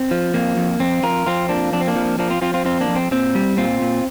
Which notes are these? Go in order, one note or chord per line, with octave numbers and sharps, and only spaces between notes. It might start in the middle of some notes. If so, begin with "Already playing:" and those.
Already playing: C4
F3
F2 A#3
F2
F2 C4
F2 F4 A#4
F2 C4 F4
F3 A#3 D4
F2 D4
C4
A#3 D4
F3
F3 A#3 D4
C4 F4
F3 C4 F4
C4 F4
F2 C4 F4
A#3 D4
F2
C4
A#2 C4
G3
A#2 C4 F4
A#2